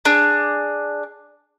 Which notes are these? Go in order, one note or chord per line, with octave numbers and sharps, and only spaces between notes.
D4 G#4